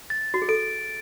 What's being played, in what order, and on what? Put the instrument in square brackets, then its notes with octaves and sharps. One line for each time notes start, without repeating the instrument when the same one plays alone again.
[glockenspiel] A6
[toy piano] F#4
G#4
[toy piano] A4 [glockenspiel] D7